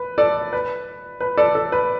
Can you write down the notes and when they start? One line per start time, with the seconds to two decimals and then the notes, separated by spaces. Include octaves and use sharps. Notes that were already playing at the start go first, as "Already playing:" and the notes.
Already playing: B4
0.18 A4 D5
0.53 B4
1.20 B4
1.37 A4 D5
1.55 A4
1.72 B4